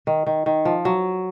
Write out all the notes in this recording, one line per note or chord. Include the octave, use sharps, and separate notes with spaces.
D#3
D#3
D#3
F3
F#3